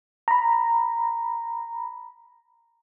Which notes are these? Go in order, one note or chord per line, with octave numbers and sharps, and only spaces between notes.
A#5 B5